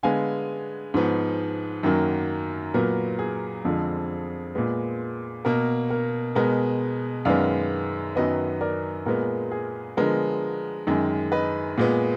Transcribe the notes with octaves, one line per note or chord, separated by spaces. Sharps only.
D3 G#3 B3 F5 G#5
G#2 F3 B3
F#2 D#3 F#3 A#3
A#2 F#3 B3 A#4
G#4
F2 D3 F3 G#3
A#2 G#3 B3
B2 A#3 A#4
A#4
B2 G#3 B3 A#4
F#2 D#3 G#3 B3 D5 F5
F#2 D#3 F#3 B3 B4 D#5
A#4 D5
A#2 G#3 B3 A#4
G#4
D3 F3 G#3 B3 A#4
F#2 D#3 G#3
B4 D#5
A#2 G#3 B3